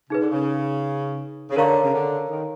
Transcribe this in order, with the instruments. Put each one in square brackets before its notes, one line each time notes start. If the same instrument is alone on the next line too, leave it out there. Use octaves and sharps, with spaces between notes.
[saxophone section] C#3 [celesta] D#4 G#4 B4
[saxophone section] D3
C#3
C#3
[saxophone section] D3 [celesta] A#4 C#5 F5 A#5 C#6
[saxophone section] C#3
D3
D#3